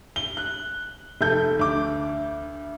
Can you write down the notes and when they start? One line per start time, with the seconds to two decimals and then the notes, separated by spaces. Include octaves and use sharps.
0.16 G7
0.37 F#6
1.21 F1 A4 G6
1.59 D2 D6